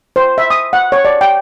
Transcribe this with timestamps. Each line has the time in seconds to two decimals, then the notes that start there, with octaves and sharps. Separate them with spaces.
0.16 C5
0.38 E5
0.50 D#6
0.73 F#5
0.92 C#5
1.05 D5
1.21 G5